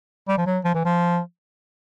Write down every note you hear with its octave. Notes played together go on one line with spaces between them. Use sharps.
G3
F3
F#3
F3
E3
F3